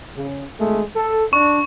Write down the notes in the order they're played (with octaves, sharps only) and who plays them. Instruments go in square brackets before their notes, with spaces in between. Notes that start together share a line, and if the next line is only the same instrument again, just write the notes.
[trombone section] C#3
G#1 G#3 A3
A4
[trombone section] D4 [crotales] C#6